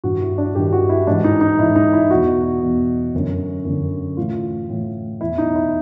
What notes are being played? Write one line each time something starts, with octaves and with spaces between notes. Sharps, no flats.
G2 D#3 F#4
E4
D4
G2 D#3 G4
F#4
E4
G#2 E3 D4
D#4
D#4
G#2 E3 E4
D#4
E4
E2 B2 F#4
E2 B2
F#2 D3
F#2 D3
A2 E3 F4
A2 E3
E2 B2 E4
D#4
E4